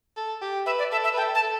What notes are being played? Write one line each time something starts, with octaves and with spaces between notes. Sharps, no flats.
A4
G4
B4 E5
D5
A4 E5
E5
B4
A4 G5
A5
A4